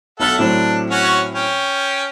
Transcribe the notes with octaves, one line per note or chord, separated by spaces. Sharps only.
B1 A4 E5 F#5 F6 F#7
A2 F#3 C4 D4
C#4 F#4 C#5
C#4 G5